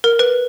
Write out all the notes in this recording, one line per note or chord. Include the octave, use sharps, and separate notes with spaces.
A#4
B4